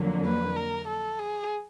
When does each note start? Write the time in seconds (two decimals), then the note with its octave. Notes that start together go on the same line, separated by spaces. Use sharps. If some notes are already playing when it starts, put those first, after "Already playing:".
Already playing: F2 D3 F#3 A#3
0.26 B4
0.56 A#4
0.88 A4
1.19 G#4